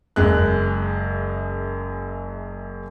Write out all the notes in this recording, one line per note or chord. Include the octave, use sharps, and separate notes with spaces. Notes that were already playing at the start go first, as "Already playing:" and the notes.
F#1 F#2 G#3 F#6